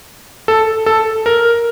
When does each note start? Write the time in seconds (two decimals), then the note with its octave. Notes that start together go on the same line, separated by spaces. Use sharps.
0.48 A4
0.86 A4
1.26 A#4